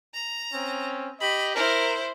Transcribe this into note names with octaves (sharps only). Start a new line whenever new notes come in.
A#5
C4 C#4
G4 D#5 B5
E4 A#4 C5